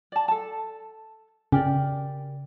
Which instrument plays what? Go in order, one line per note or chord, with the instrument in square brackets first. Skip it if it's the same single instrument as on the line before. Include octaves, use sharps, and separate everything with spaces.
[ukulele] D5 A5
A4 A5
[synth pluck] C#3 [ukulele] G4 A#4 D5